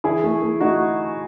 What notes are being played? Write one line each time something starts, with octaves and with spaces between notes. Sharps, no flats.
E3 E4 G#4
A3
A3
A3 D#4 F#4